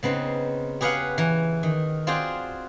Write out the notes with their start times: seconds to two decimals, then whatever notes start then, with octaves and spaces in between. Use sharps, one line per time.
0.03 C#3 B3 C4 D#4
0.81 G4 G#4 B4 C#5 F5 F#5
1.18 E3 A#5
1.63 D#3
2.07 C4 F4 F#4 G#4 D5 G5